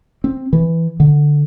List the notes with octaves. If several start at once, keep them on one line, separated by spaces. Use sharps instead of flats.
C4
E3
D3